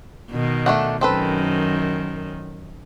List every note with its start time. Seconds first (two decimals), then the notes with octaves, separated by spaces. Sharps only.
0.31 B2 D#3
0.66 A3 D4 F#5
1.01 F#2 D#3 C4 A4 B4